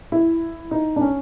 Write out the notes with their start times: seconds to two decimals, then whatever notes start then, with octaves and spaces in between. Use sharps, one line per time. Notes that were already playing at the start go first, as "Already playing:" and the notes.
0.12 E4
0.71 D#4
0.96 D4
1.01 C#4